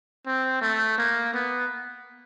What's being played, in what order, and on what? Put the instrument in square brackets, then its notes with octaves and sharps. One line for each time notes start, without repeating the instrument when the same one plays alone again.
[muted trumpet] C4
A3
A#3
B3